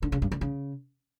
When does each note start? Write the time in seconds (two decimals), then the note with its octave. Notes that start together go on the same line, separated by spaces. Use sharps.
0.02 D3
0.12 C#3
0.22 G2
0.32 D3
0.41 C#3